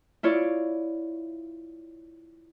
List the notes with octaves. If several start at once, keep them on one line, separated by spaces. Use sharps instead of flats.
E4 F4 C#5 D5